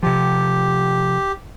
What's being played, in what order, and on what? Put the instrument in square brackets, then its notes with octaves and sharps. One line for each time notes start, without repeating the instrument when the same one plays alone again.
[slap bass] C3 F3 [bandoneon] G4